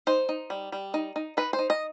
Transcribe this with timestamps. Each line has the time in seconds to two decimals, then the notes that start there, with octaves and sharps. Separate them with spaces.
0.07 D#4 C5
0.29 D#4
0.50 G3
0.72 G3
0.94 D#4
1.16 D#4
1.37 D#4 B4
1.53 C5
1.59 D#4
1.70 D#5